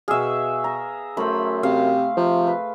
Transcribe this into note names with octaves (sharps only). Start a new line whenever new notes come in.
B2 G#4 E5 F5
A#5
F#2 A3 C5 B5
C3 F5
C3 F3
B4